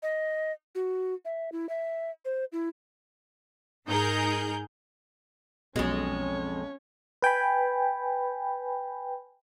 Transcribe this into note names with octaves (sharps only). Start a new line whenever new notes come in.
D#5
F#4
E5
E4
E5
C5
E4
G#2 D#4 G#4 A#4 G6
B1 F2 B2 G#3 C#4 C#5
B4 G5 G#5 B5